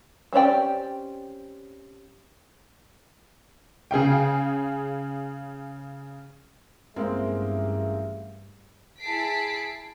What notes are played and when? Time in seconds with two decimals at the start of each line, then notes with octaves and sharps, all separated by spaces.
0.33 C4 C#4 G4 D5 G5
3.91 C#3 G#4 F5 G5
6.96 A1 G2 G#3 A#3 C4 G#4 E5
9.00 E4 G#4 A5 B6 C7 D7